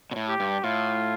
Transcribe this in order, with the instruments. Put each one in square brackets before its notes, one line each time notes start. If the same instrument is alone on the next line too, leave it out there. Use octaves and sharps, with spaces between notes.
[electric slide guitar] B2
A2
[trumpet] G4
[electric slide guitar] G2
[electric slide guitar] A2 [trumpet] F4